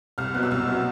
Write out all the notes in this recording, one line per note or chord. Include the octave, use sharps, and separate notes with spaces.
C2 F6
B2 F#3 B3 F#6
E6
C2 F6
B2 F#3 B3